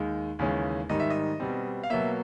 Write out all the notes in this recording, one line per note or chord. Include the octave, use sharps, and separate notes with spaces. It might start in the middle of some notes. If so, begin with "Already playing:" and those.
Already playing: D#2 D#3 G#3
D#2 C#3 E3 G#3 C#4
G#2 D#3 G3 D#5
E5
D#5
B2 G3 C4
F5
B2 F#3 A#3 E5